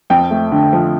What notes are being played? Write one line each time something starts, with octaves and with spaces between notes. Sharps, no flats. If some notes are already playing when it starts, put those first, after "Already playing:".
F2 G5
A3
D3
F3